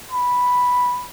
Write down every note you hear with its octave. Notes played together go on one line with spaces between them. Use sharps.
B5